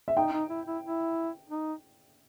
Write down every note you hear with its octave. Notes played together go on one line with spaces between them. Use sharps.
E5
D#4 G5
D#4
E4
E4
E4
D#4